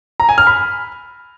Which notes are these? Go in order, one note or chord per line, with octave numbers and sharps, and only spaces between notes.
A#5
G#5
F6
B5